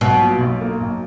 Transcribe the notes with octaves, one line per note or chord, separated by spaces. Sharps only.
B1 B2
A#2
B1
A#3
B1